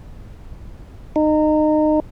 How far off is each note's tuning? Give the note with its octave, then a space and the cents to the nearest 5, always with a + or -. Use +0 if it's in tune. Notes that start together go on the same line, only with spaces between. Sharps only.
D#4 -25